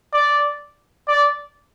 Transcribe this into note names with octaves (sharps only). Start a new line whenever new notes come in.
D5
D5